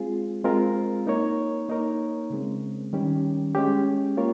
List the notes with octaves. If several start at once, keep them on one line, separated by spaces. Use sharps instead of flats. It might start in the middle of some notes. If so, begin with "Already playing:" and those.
Already playing: G#3 C4 F4 G#4
G#3 C4 F4 A#4
A#3 D#4 A#4 C#5
A#3 D#4 A#4 C#5
C#3 G#3 C4
D#3 G3 C#4 G4
G#3 C#4 G4
A#3 F4 A#4 C#5